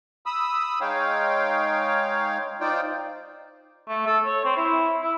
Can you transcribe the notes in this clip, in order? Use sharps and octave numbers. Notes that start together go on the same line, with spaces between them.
B5 D#6 E6
G#3 D#4 C#5 F5 G5
D#4 F4 C5 D5 G5
A3
A4
C#5
C4
E4
E4